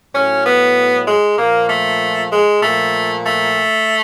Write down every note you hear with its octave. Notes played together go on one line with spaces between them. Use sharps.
A2 F#3 C#4
B3
G#3
A#2 F3 A#3
A3
G#3
A#2 F3 A3
A3